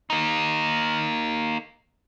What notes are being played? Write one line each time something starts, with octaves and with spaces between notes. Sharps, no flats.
A#3 D#4